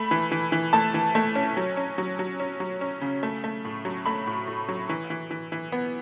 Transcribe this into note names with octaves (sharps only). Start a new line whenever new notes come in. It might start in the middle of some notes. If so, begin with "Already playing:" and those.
Already playing: A3 B5
E3
E3
E3
A3 A5
E3
A3
C#4
F#3
C#4
F#3
F#3
C#4
F#3
C#4
C#3
A3
A3
A2
F#3
A3 B5
A2
A2
F#3
E3
E3
E3
E3
B3